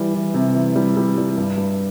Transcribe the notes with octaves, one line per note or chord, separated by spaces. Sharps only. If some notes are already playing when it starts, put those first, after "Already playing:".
Already playing: E3 G3
E3
C3
E3
G3
G3
G3
G2
G2